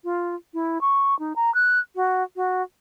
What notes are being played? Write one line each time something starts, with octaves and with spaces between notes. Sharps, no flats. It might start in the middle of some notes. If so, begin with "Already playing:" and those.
F4
E4
C#6
D#4
A#5
F#6
F#4
F#4